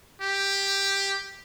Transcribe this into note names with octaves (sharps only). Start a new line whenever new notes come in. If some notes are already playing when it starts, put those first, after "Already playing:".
G4